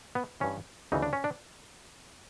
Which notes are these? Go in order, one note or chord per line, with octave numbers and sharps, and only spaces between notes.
B3
G2 E3 C#4
D2 C#3 E3 D#4
D4
C#4
D4